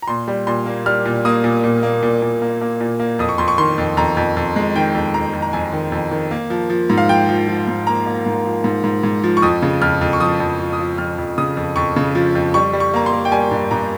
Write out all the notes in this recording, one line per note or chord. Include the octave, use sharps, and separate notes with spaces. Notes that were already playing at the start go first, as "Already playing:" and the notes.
A#5
A#2 C6
G3
A#2 C6
A#3
G3 F6
A#2
A#3 D#6
A#2
A#2
A#3
A#2
A#2
A#3
A#3
A#2
A#3
F2 D#6
C#6
F2 C6
C#6
D#3 C6
F2
F2 A#5
F2
F2
G#3
D#3 G5
F2
F2 A#5
F2
A#5
F2 G#5
D#3
F2
D#3
A#3
F3
F3
G#2
F5
F3 G5
F3
F3
G#2
A#3 A#5
A#3
G#2
F3
G#2
G#2
G#2
F3
C#6
F2 D#6
C#3
F2 F6
F2
C#6
F3 D#6
F2
F3
D#6
F3
F2 F6
F2
C#3 D#6
F2
F2 C#6
C#3
F3
F2
G3 C#6
G3
C#6
A#3 A#5
C6
A#3
G5
G3 G#5
G2
G2 A#5